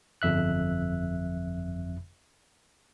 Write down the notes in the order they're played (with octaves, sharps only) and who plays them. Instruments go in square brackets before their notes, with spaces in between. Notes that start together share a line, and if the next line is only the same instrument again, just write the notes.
[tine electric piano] G1 F2 E5 F#6